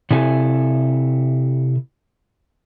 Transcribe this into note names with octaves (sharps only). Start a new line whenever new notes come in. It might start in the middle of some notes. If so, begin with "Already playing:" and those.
C3 E4 A4 G#5